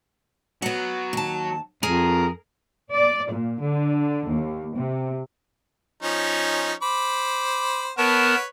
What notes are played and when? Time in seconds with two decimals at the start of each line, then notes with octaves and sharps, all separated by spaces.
0.62 F#3 B3 F#5
1.13 D#2 A5
1.83 F2 G#4 A#4
2.92 D5
3.30 A#2
3.61 D3
4.29 D#2
4.75 C3
6.03 F3 C#4 D#4
6.82 C5 B5 D6
7.98 B3 A#4 B4 C#5 A5